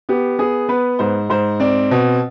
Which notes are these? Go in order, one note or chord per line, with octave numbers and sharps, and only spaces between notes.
B3 G4
B3 G#4
B3 B4
G#2 C5
G#2 C5
C4 D5
B2